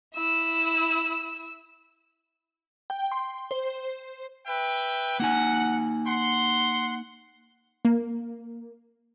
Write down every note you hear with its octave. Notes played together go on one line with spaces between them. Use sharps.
E4 E6
G5
C6
C5
B4 E5 G5
A#3 D#4 F#5 G#5
F#5 C6
A#3